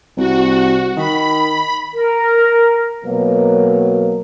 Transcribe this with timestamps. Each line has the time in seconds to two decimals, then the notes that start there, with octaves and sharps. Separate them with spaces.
0.17 C2 F#4
0.97 D#3 B5
1.94 A#4
3.05 B2 F#3 A#3 A#4